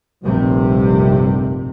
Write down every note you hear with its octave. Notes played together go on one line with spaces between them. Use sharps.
F1 A#1 G2 C3